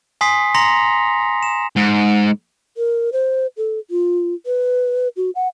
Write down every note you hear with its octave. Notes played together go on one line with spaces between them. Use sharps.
G#5 C6 D#6 B6 C7
A#5 C6 A#6 C#7 F7
E7
G#2
A#4
C5
A4
F4
B4
F#4
F#5